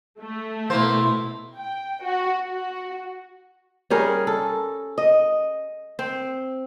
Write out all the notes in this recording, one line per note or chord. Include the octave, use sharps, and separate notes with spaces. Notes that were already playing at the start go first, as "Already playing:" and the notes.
A3
B2 A#3 E4 C5
G5
F#4
F#4
G3 C#4 G#4 A#4
A4
D#5
C4